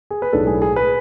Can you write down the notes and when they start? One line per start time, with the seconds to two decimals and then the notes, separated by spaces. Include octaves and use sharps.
0.11 G#4
0.22 B4
0.33 B1 A2 G#3 D4 A4
0.47 G#4
0.62 G#4
0.76 B4